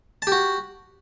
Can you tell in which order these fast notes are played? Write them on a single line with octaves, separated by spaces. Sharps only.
A5 G4 F#4